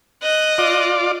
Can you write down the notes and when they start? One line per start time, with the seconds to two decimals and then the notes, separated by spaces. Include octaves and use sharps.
0.22 D#5 F#6
0.58 F4 D5